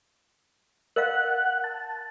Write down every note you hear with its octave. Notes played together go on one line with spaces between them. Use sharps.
A#4 D#5 F5 F#5 F#6
A5